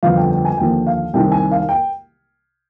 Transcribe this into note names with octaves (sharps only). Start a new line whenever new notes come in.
G1 F2 D3 F3 F5
G5
G5
G#5
D#2 D3 F3 G5
F5
C2 C3 D#3 G5
G#5
F5
G5